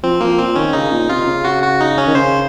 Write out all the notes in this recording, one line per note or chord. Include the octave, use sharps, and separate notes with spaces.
F3 C4
F3 A#3
A#2 C4
D#3 C#4
C#3 D#4
A#2
C3 F4
C#3
F#4
F#4
D#4
C#4
D#3
C#3 C5